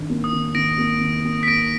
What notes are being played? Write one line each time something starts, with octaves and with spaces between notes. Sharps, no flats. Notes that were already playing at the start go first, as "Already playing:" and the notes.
Already playing: D#3 D4
A#3
D#6
D#3
D#3 A#6 D7
A#3
D#3
A#3
B6
A#3 A#6 D7